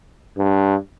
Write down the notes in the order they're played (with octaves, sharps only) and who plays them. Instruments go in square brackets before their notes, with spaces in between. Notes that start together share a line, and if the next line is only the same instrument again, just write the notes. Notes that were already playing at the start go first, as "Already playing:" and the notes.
[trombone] G2